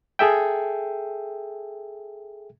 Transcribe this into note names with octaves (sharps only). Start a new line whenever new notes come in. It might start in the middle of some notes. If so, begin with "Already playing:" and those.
G#4 A4 E5 G5